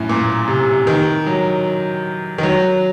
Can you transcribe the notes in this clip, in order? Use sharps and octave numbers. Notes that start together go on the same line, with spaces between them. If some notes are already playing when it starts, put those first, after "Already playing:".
Already playing: F#2 A2
A#2
C3
D#3
F#3
D#3
F#3